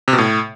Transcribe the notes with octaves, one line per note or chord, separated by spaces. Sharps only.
C3
B2
A2